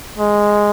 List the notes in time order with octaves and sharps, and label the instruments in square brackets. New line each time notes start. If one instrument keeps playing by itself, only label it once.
[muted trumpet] G#3